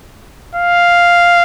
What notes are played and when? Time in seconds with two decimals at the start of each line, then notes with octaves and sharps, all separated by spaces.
0.55 F5